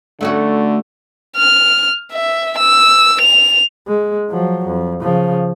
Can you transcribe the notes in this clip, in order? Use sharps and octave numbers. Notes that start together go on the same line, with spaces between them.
D3 A3 C#4 F#4
F6
E5
E6
F7
G#3
F3 F#3
F2
C#3 F3